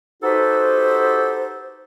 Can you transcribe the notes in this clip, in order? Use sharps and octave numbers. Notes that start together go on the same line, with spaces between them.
D#4 F#4 G4 A4 B4 C5